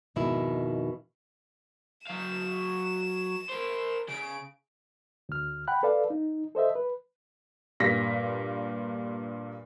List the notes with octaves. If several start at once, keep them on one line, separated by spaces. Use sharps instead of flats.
F2 G#2 B2 D#3 E4
F#3 F5 E7
A#4 C5
C#3 D7
D2 F6
F#5 G5 B5 F#6
A4 B4 D5 F5
D#4
A4 C5 D#5 E5
B4
G2 A#2 A#6 B6